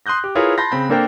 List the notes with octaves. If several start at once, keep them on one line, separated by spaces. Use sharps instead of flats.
C6 D#6 F#6 G6 A#6
G4
E4 F4 G#4 A#4 B4 C#5
A5 B5 C6 G6 A#6
C#3 C4 B5 G6
A#3 D4 A4 A#4 C5 G5